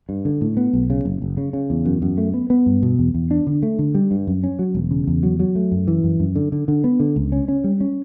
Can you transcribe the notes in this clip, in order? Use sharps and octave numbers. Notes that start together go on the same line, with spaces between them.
G2
D3
A2
B3
B1
C#3
F#1
F#1
C#3
C#3
E2
F#2
F#2
A3
B3
B3
G2
B2
E2
E2
D4
D3
A3
D3
G3
G2
F#2
C#4
F#3
E1
C#3
E2
F#3
F#3
A3
F#2
E3
F#2
F#2
D3
D3
D3
B3
D3
C#2
C#4
C#4
G3
C#4